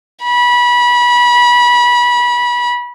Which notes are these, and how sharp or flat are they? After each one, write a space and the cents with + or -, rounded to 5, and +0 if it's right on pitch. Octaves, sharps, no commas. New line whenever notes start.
B5 -25